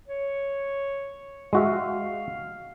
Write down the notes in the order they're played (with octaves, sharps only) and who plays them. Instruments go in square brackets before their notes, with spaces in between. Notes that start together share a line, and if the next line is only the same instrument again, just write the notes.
[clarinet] C#5
[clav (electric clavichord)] G#3 F#4 E5 [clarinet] F5